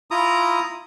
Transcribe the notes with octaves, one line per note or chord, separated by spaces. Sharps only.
E4 F4 A#5 D#6